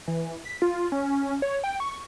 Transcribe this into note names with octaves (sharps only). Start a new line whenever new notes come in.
E3
B6
F4
C#4
C#5
G5
C#6